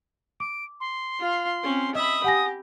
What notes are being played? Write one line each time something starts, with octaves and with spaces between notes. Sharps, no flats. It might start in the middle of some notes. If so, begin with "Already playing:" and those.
D6 D7
C6
F4 F5
C4 C#4
D#5 E5 B5 D#6
G4 F#5 G#5 A#6